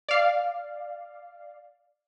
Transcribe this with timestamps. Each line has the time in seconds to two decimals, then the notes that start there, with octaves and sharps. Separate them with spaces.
0.08 D5 F5